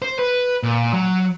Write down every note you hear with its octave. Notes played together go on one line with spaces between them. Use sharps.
C5
B4
A#2
F#3